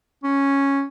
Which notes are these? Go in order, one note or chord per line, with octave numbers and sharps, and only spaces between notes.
C#4